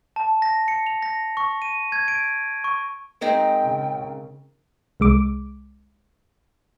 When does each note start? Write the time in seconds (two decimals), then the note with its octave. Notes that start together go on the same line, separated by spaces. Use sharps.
0.16 A5
0.42 A#6
0.68 C#7
0.86 F7
1.02 A#6
1.37 C#6
1.62 D#7
1.92 G#6
2.08 D7
2.64 C#6
3.21 G#3 C4 D#4 A#4 G5
3.62 C#3
5.00 C2 G#3 D6